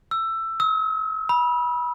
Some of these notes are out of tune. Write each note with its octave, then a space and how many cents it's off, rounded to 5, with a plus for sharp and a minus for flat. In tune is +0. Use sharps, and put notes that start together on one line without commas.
E6 +15
E6 -45
B5 -25